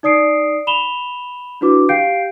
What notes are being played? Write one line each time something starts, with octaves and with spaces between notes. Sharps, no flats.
D#4 D5 D#6 C7 D7
B5 E7 F7 G7
D4 E4 F#4 B4 D6
G4 F5 G5 G6 C7 D7